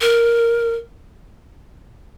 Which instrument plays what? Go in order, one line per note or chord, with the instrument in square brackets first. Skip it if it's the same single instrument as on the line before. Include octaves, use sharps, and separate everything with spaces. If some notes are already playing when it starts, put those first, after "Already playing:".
[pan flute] A#4